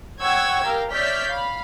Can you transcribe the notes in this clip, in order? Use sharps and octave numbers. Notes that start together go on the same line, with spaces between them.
C#5 F#5 G5 C#6 E6 G#6
G4 A#4 F5 G5
C#5 D5 E5 F6 G6 B6
F5 B5